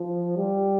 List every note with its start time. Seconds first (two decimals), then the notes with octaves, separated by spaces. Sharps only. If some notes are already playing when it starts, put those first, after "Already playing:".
Already playing: F3
0.37 G3